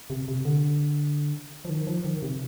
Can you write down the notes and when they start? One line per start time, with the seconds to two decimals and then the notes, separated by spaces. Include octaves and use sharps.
0.10 C3
0.28 C3
0.45 D3
1.65 F3
1.69 D#3
1.87 F3
2.04 D#3
2.22 C3